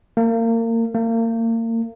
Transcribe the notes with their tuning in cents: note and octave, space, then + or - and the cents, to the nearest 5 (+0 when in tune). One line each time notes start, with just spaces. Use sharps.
A#3 -30
A#3 -35